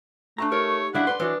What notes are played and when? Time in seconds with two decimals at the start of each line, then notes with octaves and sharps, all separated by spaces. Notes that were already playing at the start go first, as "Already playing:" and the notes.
0.38 A3 D4 A5 A#5
0.52 D#4 G4 A#4 C#5
0.94 C#3 G3 D4 E4 F#5
1.07 B4 D5 C6
1.20 E3 F#3 D4 B4 D#6